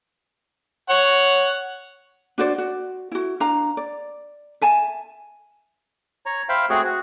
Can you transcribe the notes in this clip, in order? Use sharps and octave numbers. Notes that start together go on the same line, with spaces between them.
C#5 F#5
D4 F#4 C5 D5
F#4
E4 F#4
D4 F5 A#5
D5
E5 G#5 A5
C#5 A#5
C5 E5 F5 G5 B5
A3 C4 F#4 G#4 C#5
F#4